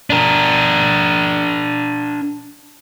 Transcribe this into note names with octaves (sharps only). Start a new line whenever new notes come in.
D4 A#4